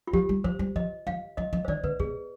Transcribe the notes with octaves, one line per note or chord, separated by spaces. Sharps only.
F4
F3 G4
G3
F3 C5
G3
F3 D#5
F3 F5
F3 D#5
F3 D#5
C5
D#3 D5
D3 B4
B2 G#4